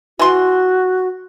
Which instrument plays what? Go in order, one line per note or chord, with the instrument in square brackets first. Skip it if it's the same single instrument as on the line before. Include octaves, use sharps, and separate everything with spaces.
[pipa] E3 C6 [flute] F#4